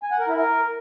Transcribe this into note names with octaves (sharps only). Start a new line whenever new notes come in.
G#5
F#5
A#4
E4
A#4